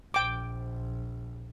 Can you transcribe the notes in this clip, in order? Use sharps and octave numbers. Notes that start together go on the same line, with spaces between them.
A#1 G5 D6